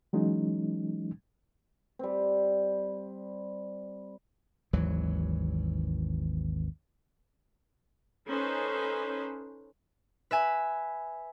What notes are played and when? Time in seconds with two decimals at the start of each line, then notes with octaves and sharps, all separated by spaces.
0.13 E3 F#3 G#3 C#4 D#4
1.99 G3 C4
4.73 G#1 D#2 E3 F#3
8.28 C#4 D#4 A4 B4 C5
10.31 B4 E5 G#5